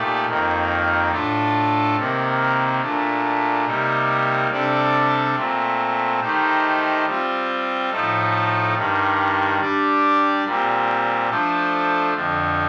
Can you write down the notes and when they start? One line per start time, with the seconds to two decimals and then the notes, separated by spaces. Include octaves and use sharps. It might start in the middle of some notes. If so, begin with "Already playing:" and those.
Already playing: A#2 A3 D#4 G4 D5
0.26 F2 D#3 A#3
1.11 A2 A3 D4 F4 A4
1.96 C3 D#3 A#3
2.81 A#2 A3 D4
3.66 C3 G3 A#3 D#4
4.50 C3 G3 D4 A4 D5
5.35 A#2 A3 C4
6.20 D#3 A3 D#4 G4 C5
7.05 G3 C4 F4
7.90 A2 F3 A3 D#4 A4
8.75 G2 D#3 G3
9.60 G3 D4 G4 D5
10.44 A#2 G3 C4
11.29 F3 A3 D4 A4 C5
12.14 F2 D3 F3